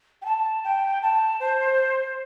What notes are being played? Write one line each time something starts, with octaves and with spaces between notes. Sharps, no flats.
G5
A5
G5
A5
C5